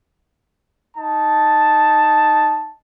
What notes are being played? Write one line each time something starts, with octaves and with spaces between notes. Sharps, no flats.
D#4 A5